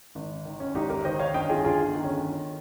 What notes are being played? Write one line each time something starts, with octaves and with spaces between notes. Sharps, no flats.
G#1
D#3
C#4
G#1 D#4 G4
G4 A#4
D#3 C5 D#5
C#5 F5
G1 D#5 G5
F4 G#4
G1 F4 G#4
D#3
C#4